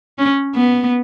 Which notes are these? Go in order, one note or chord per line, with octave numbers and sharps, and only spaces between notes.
C#4
B3